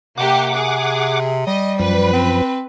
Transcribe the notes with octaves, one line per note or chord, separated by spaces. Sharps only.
C3 A#3 G4 F#5 D6
G#4
G3 D#5
F#2 F3 B4
C4